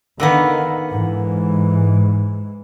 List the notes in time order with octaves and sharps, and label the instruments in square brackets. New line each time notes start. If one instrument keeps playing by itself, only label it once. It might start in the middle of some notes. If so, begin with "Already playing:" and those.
[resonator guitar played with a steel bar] D3 A#3 B3 [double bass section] D#3
[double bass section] G#2 E3